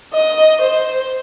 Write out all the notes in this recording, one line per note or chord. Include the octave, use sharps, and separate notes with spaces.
D#5
C5